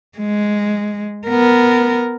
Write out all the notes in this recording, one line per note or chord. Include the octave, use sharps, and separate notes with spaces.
G#3
B3 A#4